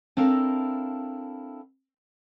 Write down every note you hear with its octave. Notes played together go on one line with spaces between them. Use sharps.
C4 D4 E4 A4 A#4 F5